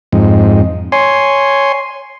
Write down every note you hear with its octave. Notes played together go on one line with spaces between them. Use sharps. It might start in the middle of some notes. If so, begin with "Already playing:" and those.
F2 G#2
C#5 G#5 C6